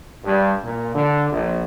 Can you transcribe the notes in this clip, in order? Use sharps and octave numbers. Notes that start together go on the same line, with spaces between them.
G2
A#2
D3
A#1